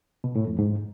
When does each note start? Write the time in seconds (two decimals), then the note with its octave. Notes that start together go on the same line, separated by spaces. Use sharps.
0.24 B2
0.35 A2
0.47 F2
0.59 G#2